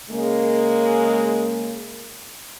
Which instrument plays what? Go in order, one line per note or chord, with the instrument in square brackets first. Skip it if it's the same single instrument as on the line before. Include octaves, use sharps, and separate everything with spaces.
[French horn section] C#3 G#3 A#3